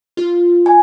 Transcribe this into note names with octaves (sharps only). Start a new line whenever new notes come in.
F4
G#5